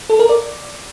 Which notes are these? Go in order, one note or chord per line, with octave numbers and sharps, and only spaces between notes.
A4
A#4
D5